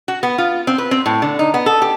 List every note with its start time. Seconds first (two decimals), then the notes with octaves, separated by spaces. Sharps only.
0.08 F#4
0.23 B3
0.38 F4
0.67 C4
0.78 B4
0.91 C4
1.06 A2
1.22 D3
1.39 D#4
1.54 B3
1.66 A4
1.82 G4